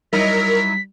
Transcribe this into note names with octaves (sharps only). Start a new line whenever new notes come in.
F#3 G3 D#4 E4 A#4 B6